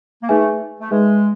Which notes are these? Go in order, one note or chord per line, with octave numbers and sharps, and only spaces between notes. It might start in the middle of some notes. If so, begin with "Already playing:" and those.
A#3
A3 D#4 G#4 B4 E5 G#5
A3
G#3 D#4 G#4 B4 E5 G#5